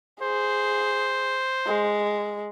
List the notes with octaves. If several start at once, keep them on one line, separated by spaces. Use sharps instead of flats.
G#4 C5
G#3